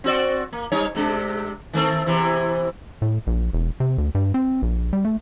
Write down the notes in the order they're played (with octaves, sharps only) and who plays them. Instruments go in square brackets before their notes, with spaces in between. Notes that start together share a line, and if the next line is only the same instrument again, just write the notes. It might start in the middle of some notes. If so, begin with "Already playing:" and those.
[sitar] C4 F#4 D5
A#3
G3 D#4 C#5
C3 G#3 D4
D#3 A3 C4
E2 C3 E3
[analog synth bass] A2
A#1
E1
C3
D2
G2
C4
A#1
G3
A3